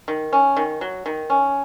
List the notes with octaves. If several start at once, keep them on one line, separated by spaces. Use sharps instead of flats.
D#3
C#4
D#3
F#3
D#3
C#4